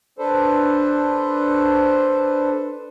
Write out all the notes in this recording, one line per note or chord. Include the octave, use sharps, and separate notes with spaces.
D4 A4 B4 C5